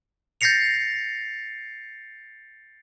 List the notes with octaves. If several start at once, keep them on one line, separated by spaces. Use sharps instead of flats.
G6 A6 A#6 C7 C#7 F7